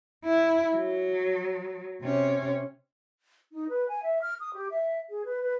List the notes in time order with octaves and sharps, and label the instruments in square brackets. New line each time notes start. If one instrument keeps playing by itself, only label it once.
[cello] E4
F#3
C3 C#4
[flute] D#4
B4
G#5
E5
F6
D#6
G4
E5
G#4
B4
B4